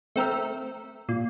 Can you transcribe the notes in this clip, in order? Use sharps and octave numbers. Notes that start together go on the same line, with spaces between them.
A3 C4 A#4 E5
A#2